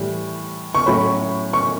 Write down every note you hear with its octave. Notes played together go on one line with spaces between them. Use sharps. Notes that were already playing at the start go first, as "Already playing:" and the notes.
Already playing: A2 E3 G3
C#6
A2 F#3 C#4 B5
C#6